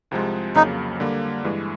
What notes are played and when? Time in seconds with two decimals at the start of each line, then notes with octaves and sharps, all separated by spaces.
0.11 C2 C3 F3 G#3
0.55 F2 C#3 F#3 A#3 D#4
1.00 D3 G3 A#3
1.44 G2 E3 G#3